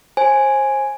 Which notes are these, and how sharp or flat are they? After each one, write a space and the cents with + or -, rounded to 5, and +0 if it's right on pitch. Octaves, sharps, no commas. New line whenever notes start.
C5 +30 G#5 +0